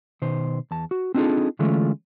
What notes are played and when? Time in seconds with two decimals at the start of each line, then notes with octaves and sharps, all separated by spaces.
0.22 B2 D#3 C5
0.71 E2 A5
0.91 F#4
1.14 C4 D4 D#4 F4 G#4 A4
1.59 D3 E3 G#3 A3 C#4 F4